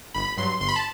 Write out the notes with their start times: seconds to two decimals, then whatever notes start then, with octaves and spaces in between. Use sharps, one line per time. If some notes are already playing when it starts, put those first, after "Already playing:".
0.14 G1 B5
0.37 G2 F#3 C6
0.60 G1 C6
0.68 B5
0.76 A5